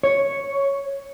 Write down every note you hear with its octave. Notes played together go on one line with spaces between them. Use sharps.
C#5